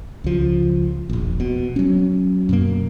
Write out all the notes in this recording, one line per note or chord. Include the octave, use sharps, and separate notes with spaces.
C#2 F3
E1 A#1
B2
F#3 C#4
F#2 B2 A#3